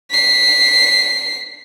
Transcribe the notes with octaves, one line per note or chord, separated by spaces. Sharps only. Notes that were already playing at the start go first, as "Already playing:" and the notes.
B6 C7